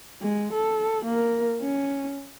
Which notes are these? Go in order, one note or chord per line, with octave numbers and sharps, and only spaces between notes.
G#3
A4
A#3 A#4
C#4